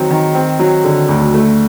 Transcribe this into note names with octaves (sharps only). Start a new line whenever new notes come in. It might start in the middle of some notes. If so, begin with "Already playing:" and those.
Already playing: D#3 F#3 C4
D#3
C4
F#3
D3
D2
A3